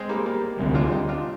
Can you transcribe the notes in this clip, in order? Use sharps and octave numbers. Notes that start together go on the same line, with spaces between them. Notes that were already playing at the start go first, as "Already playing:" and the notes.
Already playing: G#3 C4
G3 A#3
G3 A#3
D2 C3 G3
D4 F4
D#4 G4
D4 F4